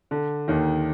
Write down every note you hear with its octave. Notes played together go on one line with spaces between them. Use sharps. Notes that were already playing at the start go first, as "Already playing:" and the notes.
D3
D#2 D#3